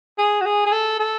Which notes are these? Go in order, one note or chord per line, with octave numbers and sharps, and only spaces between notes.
G#4
F#4
G#4
G#4
A4
A4